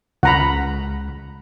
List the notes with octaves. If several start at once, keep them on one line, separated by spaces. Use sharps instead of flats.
C#2 F#5 A#5 B5